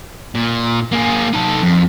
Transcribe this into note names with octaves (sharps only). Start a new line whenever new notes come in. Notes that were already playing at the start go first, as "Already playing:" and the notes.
A#2
A#3 G#4
D#4 A4
F2